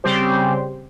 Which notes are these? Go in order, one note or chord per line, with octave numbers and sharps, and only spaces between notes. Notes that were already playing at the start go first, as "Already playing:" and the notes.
C#3 G3 C4 G4 C5